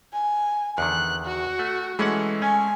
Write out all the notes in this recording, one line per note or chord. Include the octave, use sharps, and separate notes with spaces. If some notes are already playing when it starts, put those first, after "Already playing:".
G#5
E2 D3 D#3 F#6
F#4
A3
E3 G#3 A3 C#4 F#5
C#4 G#5